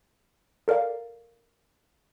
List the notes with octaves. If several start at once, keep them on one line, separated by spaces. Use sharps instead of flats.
A4 A#4 D5 F5